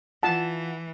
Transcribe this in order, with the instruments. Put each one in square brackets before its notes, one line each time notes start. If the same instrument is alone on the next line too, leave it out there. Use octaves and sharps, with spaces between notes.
[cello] E3 [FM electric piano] F4 F#5 [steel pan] A5